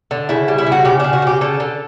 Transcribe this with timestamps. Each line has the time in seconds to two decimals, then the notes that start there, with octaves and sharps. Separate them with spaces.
0.11 D3
0.29 C#3 E4
0.48 G3
0.58 E4
0.67 C#3
0.72 F#4
0.85 C#3 G4
1.00 C#3 D4
1.13 F#4
1.22 C#3 G4
1.41 D3 A4
1.60 D3